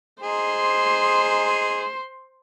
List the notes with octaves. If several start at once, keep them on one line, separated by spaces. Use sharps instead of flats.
D#4 G#4 C5 C6